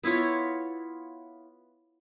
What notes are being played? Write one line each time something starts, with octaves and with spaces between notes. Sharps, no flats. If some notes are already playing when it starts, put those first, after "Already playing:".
B3 E4 F4 C#5